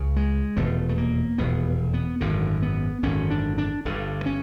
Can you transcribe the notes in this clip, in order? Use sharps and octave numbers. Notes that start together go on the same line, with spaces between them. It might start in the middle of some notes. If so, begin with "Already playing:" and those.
Already playing: C#2 C#3
G#3
F1 E2 B2 A3
A3
A#3
F1 E2 B2 B3
B3
G#1 F#2 D3
B3
G#1 F#2 D3 C#4
D4
D4
G1 G2 D3
C#4